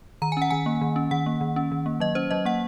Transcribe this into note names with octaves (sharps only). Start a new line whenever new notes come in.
D#3 A#5
G#5
C#4 F#5
D#3 G#5
A#3
D#3
C#4
D#3 F#5
A#3
D#3
C#4
D#3
A#3
F#3 D#5
C#4 C5
F#3 D#5
A#3 F#5